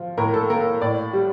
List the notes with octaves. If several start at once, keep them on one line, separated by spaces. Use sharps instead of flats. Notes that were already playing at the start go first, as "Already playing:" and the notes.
Already playing: F3
A2 A#4
A4
A#3 A#4
A2 D5
G3